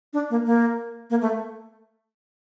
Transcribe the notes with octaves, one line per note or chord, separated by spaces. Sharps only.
D4
A#3
A#3
A#3
A3